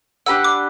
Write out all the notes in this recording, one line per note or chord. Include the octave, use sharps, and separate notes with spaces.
D4 G4 B4 F#5 E6
D6